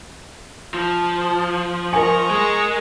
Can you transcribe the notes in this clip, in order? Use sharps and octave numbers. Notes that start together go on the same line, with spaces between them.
F3
A#4 D#5 G#5 A#5 C#6
G#3